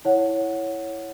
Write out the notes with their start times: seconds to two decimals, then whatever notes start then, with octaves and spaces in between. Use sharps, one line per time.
0.05 E4 C#5 F#5